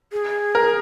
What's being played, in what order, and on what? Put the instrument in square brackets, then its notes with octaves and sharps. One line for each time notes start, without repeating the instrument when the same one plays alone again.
[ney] G#4
[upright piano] A#4